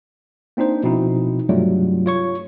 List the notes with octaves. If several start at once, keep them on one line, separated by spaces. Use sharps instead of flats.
A#3 C4 D4 D#4 C5
B2 F3 C4 D#4 E4
G2 C3 F#3 G3 A3 F4
F4 C#5 C#6